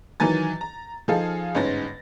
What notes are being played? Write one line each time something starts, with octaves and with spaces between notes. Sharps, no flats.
D#3 E3 F#3 G#5 A6
A#5
F3 D#4 G#4 A4 F5
G1 G#2 C#4 A6 A#6